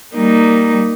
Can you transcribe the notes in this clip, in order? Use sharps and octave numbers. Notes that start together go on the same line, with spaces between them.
G3 A#3 D#4